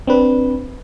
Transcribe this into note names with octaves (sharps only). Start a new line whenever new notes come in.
C4 D4 B4